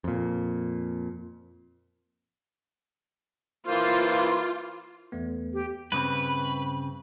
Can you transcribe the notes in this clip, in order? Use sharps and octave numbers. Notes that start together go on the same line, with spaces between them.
F2 A#2
E3 A#3 F4 C5
E2 A3 B3
G4
G2 C#3 C4 B4